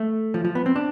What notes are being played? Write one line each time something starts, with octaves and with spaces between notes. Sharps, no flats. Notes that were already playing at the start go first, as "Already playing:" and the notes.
Already playing: A3
F3
F3
B3
C4
D4